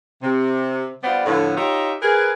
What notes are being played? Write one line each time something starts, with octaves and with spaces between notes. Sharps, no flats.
C3
G3 B3 F4 C5 D5
A2 D3 F3 B3
D#4 F4 G4 C#5 D#5 E5
G#4 A#4 B4